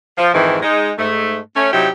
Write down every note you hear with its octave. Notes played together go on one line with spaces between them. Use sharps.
F3
F2 G#2 D#3 E3
G#3 D#4
G#2 A3
A3 C#4
C3 F#3 D#4 E4 G4